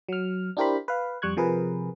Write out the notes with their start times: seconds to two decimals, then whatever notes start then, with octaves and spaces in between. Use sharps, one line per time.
0.09 F#3 F6
0.57 D4 E4 G4 A#4 C5 B5
0.88 B4 F5
1.22 F2 G3 C#6 F#6 G#6
1.37 C3 F3 G#4 A#4 B4